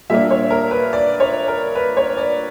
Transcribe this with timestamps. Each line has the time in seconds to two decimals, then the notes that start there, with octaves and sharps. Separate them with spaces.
0.10 A#2 G3 A#3 D4 E5
0.30 C#5
0.50 A#4
0.71 B4
0.93 D5
1.20 C#5
1.48 A#4
1.75 B4
1.97 C#5
2.17 D5